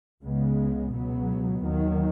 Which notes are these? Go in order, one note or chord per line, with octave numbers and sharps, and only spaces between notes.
C#2 C#3 G#3 B3
C#2 B2 F#3 B3
D#2 D#3 F#3